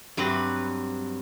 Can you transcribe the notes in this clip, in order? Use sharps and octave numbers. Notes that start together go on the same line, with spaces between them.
G2 F#3 C4 B4